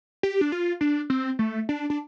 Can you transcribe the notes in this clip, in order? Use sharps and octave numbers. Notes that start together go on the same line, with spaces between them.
G4
D4
F4
D4
C4
A3
D4
D4